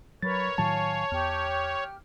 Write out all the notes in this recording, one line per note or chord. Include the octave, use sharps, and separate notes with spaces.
F#3 A#4 B4 C#5 B5 A6
A2 D#3 F#3 F5 G#5 A5
E2 G4 G5 F6